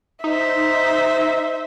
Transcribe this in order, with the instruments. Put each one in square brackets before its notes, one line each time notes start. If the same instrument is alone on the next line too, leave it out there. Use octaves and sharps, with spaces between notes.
[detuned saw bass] D#4 [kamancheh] C5 E5